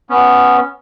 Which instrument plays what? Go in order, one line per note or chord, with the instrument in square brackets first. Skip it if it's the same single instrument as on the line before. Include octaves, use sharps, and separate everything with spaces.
[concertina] B3 C#4